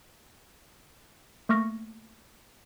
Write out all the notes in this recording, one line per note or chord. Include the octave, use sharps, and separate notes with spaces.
A3 A#3 C#6 F6 A#6